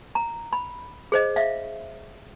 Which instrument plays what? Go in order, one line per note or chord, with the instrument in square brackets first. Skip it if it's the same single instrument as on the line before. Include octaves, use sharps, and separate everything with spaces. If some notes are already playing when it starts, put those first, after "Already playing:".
[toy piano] A#5
B5
G#4 C5 D#5
E5 F5